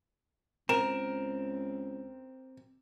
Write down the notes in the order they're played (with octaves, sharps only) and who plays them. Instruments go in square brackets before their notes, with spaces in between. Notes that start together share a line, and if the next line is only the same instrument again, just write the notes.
[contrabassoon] C#2 [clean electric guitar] C4 [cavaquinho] A#4 [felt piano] E7